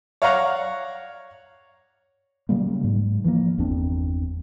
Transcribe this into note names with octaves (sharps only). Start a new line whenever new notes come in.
C#5 D5 F5 F#5 A#5 C#6
C#3 F#3 G3 A#3
G#2
E3 F3 A3 A#3
G1 E2 C4 D4